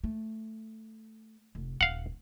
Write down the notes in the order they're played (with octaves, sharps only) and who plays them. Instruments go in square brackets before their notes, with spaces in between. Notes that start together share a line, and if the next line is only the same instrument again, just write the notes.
[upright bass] A3
F1
[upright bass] D#1 [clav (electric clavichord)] F5 F#5